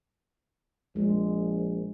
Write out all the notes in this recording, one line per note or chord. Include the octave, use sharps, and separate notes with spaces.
A#1 G#3